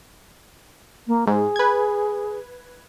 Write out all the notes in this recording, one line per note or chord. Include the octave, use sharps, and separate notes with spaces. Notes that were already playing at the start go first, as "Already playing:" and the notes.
A#3
G#2 G#4
B4 G#6